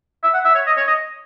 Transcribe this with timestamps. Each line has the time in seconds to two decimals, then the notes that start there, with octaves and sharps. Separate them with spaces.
0.23 E5
0.34 F#5
0.45 E5
0.55 C#5
0.67 D#5
0.77 C#5
0.87 D#5